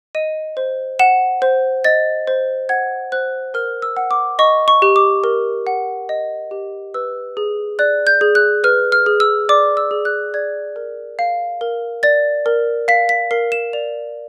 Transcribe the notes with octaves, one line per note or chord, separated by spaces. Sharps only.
D#5 D#7
C5
F#5 E7
C5
D#5 A6
C5
F#5 G#6
C5 F#6
A#4 F6
E6
F#5
D6
D#5 C#6
C#6
G4
D6
A#4
F#5
D#5
G4
B4 E6
G#4
D5 F#6
G6
G#4
F#6
B4 F6
F6
G#4
E6
D5 D6
E6
G#4
F#6
D5 G#6
A#4
F5
A#4
D5 A6
A#4
F5 B6
B6
A#4 C7
E7
D5 F7